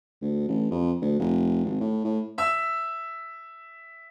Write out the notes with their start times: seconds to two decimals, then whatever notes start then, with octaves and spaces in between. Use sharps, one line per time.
0.22 D2
0.48 A1
0.71 F2
1.01 D2
1.19 F1
1.64 G#1
1.80 A2
2.04 A2
2.38 E5 E6